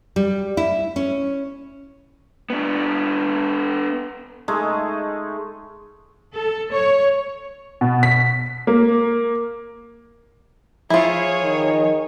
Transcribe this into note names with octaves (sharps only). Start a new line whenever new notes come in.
G3
E4
C#4
B3 D4
G#3 A3 D#4 G#4
A4
C#5
B2
B6
A#3
F3 E4 F4 G#4 C#5
D#3